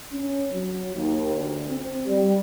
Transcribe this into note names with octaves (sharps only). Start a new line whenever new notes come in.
C#4
F#3
D#2
D2
C4
G3